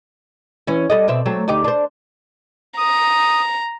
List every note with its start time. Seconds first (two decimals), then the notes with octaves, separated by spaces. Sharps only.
0.67 E3 C#4
0.90 G3 A4 D#5
1.08 B2 C4 E5
1.26 F#3 A3 C4
1.48 D2 D#4 G4
1.64 D4 C5
2.78 A#5 D#6